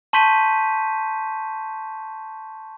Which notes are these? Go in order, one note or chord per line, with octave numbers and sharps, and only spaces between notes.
A5 C6 C#6 G6 B6 D#7